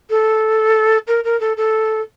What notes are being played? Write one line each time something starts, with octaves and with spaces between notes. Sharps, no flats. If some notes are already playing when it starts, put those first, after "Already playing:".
A4
A#4
A#4
A4
A4